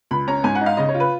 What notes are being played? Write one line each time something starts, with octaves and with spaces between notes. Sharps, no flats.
C#2 B5
C#4 A#5
G#2 G#5
F#5
D#4
F5
C#3 D#5
C#5
F4
B4